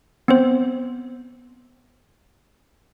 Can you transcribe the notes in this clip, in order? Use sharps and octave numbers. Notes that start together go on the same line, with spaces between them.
B3 C4 C5